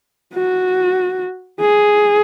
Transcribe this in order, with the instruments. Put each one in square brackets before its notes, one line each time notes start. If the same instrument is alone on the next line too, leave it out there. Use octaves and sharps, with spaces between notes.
[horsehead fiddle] F#4
G#4